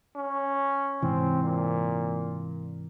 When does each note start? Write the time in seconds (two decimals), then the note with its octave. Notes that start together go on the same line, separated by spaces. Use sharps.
0.15 C#4
1.02 G#2 C3 E3 C4
1.43 A#2